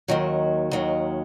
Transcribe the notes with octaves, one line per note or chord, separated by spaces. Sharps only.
D#2 D#3 F#3
D#2 D#3 F#3